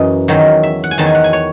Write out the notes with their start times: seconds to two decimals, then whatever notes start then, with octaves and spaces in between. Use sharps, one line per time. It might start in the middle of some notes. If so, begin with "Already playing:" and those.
Already playing: F#2 E3 D#5
0.28 E2 D#3 F#3
0.63 E5
0.84 F#5
0.91 G#5
0.98 E2 D#3 F#3 A5
1.06 G#5
1.15 F#5
1.24 G#5
1.33 C#5